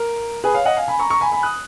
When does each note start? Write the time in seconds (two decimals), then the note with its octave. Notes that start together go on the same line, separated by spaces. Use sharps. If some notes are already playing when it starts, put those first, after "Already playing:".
Already playing: A#4
0.44 G#4 B4
0.54 C#5 F5
0.65 D#5 F#5
0.77 F5 G#5
0.88 G#5 B5
0.99 A#5 C#6
1.10 A#5 C#6
1.21 G#5 B5
1.32 G#5 B5
1.43 D#6 F#6